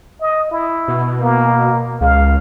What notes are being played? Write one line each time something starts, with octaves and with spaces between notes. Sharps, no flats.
D#5
E4
B2
A#3
C#2 F5